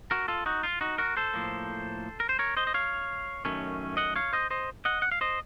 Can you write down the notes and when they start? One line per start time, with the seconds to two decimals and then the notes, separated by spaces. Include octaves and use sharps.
0.11 F#4 A#4
0.28 F4 A4
0.46 D#4 F#4
0.63 F4
0.81 D#4 F#4
0.98 F#4 A#4
1.17 A4 C5
1.34 A2 F3 A#3
2.20 A#4
2.29 C5
2.39 A#4 C#5
2.57 C5 D#5
2.67 D#5
2.74 C#5 F5
3.45 F#2 D#3 A3 C#4
3.97 D#5 F#5
4.16 C#5 F5
4.33 C5 D#5
4.50 C5 D#5
4.85 D#5 F#5
5.02 F#5
5.12 F5
5.21 C5 D#5